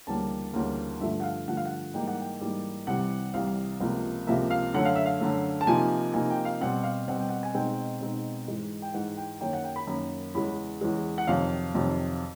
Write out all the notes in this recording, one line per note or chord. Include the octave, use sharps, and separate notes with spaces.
D2 C#3 E3 G3 A#3 A5
D2 C#3 E3 G3 A#3
G2 D3 F3 A3 E5
F#5
F5
G2 D3 F3 A3 F#5
F5
F#5
G#2 E3 G3 A#3 D#4 G5
F#5
G5
G#2 E3 G3 A#3 D#4
C2 C3 E3 G3 F#5
C2 C3 E3 G3 F5
C#2 C3 F3 A#3
C#2 C3 F3 A#3 E5
F5
F#2 D3 F#3 A3 F#5
F5
E5
F5
F#2 D3 F#3 A3
A5
C3 F3 A#3 D#4 G#5
C3 F3 A#3 D#4 G#5
G5
F5
B2 G3 C4 F#5
F5
B2 G3 C4 F#5
G5
F#5
G#5
B2 G#3 C4 D#4 G5
B2 G#3 C4 D#4
G#2 E3 G#3
G5
G#2 E3 G#3 F#5
G5
F#2 D#3 F#3 A#3 C#4 G5
F#5
G5
B5
F#2 D#3 F#3 A#3 C#4
E2 C#3 E3 G#3 B5
E2 C#3 E3 G#3
F#5
F2 C3 D#3 F#3 F5
F2 C3 D#3 F#3